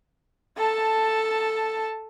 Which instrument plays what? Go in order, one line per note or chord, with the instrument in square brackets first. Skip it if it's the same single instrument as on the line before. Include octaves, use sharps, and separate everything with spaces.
[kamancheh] A4 A5